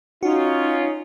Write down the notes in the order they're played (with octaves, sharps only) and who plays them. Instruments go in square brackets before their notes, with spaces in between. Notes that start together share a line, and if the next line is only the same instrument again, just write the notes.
[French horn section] C#4 F4 [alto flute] D#4 [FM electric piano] F#4